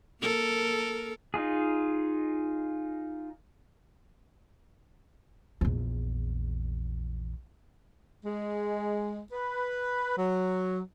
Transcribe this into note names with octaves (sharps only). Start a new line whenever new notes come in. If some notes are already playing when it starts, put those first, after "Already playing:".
A#3 A4 A#4
D#4 F4 G#4
A#1 E2
G#3
B4
F#3